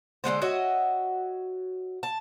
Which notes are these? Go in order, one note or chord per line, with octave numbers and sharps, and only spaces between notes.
D3 G#3 B3 C5
F#4 C#5 D#5 E5
A5